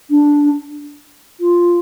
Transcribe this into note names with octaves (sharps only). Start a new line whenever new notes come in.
D4
F4